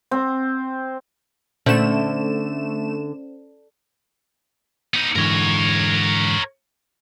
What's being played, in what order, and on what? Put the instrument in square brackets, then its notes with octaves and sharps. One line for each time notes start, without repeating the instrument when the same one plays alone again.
[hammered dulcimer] C4
[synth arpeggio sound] A#2 [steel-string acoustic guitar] D3 [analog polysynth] A3 E7 [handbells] C#4 C5
[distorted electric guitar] B3 D#4
[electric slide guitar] G#2 D3 E3 [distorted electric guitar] A#4 C#5